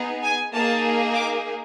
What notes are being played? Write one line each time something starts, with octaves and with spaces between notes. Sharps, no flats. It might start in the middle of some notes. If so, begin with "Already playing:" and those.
Already playing: B3 D#4 G#4
G#5
A#3 D#4 G#4 A5
D6